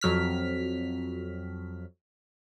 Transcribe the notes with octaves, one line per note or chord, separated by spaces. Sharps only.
F2 F#3 F6 B6